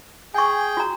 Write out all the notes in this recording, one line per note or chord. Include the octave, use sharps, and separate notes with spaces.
G#4 G5 G#5 C#6
F#4 A#5